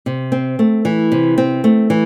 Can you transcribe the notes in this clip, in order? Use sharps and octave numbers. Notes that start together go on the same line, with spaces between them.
C3
C4
A3
E3
C3
C4
A3
E3